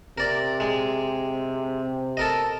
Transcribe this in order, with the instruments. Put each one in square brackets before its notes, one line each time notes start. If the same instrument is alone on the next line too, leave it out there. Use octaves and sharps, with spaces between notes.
[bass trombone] C3 [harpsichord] A#4 D5
[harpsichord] G#3
A4 A#4 D#5